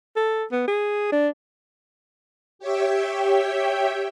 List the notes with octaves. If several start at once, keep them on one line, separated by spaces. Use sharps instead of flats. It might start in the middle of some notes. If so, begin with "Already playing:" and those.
A4
B3
G#4
D4
G4 C#5 E5 G5